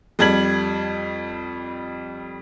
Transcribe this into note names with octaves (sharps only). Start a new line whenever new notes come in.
F2 G3 G#6 F#7